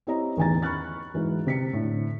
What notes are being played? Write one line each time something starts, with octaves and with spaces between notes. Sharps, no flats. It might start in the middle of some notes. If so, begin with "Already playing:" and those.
C4 E4 G4 C#5 D#5 A#5
A1 E2 D#3 G#5 A#5 A6
B5 C#6 F6 F#6 A6
G#2 E3 F#3
C3 B6 C#7
A2 D3